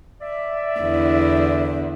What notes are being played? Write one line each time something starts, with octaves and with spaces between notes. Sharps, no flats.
D5 E5
E2 D3 E4